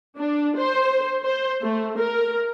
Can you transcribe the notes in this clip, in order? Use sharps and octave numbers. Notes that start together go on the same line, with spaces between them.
D4
C5
C5
A3
A#4